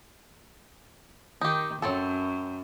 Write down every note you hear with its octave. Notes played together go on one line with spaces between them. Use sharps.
D#3 D#4 G4
F#2 F#3 C4 A4